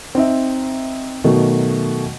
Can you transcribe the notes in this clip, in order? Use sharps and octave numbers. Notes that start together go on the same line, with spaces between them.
C4 D#4 E5
B2 D#3 F#3 A3